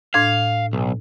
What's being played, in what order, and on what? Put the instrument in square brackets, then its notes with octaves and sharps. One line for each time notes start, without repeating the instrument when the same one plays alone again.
[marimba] A2 D4 G#6 [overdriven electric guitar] F5
[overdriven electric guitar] B1